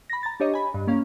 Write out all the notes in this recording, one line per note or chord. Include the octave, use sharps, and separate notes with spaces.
B5 A#6
A#5 A6
D4 G4 C#5 D#5
G#5 B5
G2
A#3 C#4 F5